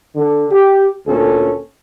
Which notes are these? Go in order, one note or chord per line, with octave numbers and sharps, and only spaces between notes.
D3
G4
D2 A#2 C#4 A4